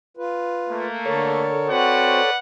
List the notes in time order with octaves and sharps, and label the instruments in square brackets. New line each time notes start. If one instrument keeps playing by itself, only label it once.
[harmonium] F4 B4
[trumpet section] A3 A#3
[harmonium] D3 A#4 [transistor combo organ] A4 C#5
[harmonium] C4 F#4 C5 [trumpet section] B4 D5 F#5